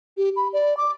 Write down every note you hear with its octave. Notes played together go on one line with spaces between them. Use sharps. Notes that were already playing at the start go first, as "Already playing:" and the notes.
G4
B5
D5
D6